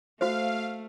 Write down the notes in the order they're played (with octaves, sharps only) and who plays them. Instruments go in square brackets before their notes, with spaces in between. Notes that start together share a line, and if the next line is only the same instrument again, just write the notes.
[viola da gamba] A3 [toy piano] F#4 C5 [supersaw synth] F5